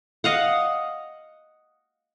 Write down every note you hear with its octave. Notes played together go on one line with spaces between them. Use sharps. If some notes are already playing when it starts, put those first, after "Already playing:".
D#5 F5 F#5